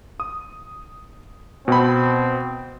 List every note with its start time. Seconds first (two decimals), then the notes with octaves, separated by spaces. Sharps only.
0.20 D#6
1.68 B2 C4 B5